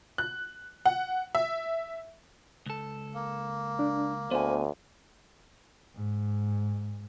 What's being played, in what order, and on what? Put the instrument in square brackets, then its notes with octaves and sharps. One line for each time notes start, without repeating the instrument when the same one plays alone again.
[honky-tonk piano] F#6
F#5
E5
[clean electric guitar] C#2 A4
[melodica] A#3
[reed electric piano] D4
[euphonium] D2 [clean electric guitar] B3 G#5 [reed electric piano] C5
[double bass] G#2